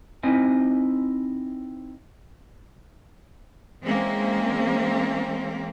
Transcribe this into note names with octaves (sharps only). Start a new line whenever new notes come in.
C4 D#4 E4 D#5 G#5
E3 G#3 A#3 C4 C#4